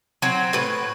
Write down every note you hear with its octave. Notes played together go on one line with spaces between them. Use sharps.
F#3 C4
A2 B4